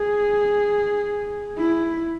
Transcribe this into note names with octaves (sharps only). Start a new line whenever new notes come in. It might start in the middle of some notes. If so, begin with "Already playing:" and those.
Already playing: G#4
E4